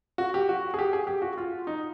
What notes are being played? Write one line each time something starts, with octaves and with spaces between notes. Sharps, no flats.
F#4
G4
F#4
G#4
G4
G#4
G4
F#4
F4
D#4